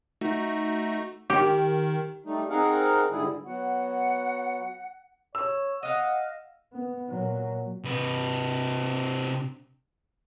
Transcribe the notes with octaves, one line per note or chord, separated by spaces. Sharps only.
A3 D#4 F#4
D#3 G4
G3 A3 D#4
C4 D#4 G#4 A#4 F5 F#5
G#2 D3 G3 E4 G#4
F#3 B3 F#4 F#5
C#5 E6
D#5 F5 F#5
B3
A#2 F#3
C3 B4